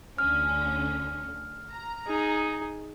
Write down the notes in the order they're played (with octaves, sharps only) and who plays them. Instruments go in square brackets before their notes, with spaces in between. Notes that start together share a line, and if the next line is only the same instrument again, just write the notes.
[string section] D2 D3 C#4 [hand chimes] F6
[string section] A#5
[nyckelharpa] D#4 G#4